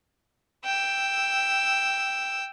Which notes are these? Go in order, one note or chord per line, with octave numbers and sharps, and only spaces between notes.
G5 E6